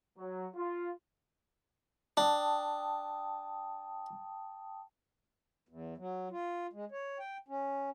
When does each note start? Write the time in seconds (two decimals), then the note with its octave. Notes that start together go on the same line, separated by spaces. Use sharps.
0.18 F#3
0.55 F4
2.17 D4 G5 A5 D#6
5.69 E2
5.97 F#3
6.31 F4
6.73 G#3
6.92 C#5
7.19 G5
7.48 C#4